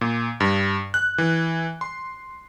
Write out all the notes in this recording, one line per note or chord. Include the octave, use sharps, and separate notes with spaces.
A#2
G2
F#6
E3
C6